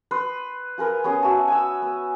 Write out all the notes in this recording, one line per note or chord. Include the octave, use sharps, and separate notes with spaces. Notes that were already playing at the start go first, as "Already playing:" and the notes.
B4 C6 D#6
F4 G#4 A#4 B4
B3 C#4 G#4
C#4 F#4 E5 A5
G#5 E6
B3